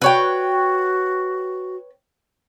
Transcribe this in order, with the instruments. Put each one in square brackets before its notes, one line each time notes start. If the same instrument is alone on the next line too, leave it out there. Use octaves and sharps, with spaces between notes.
[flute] F#4 [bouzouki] B4 C#5 G5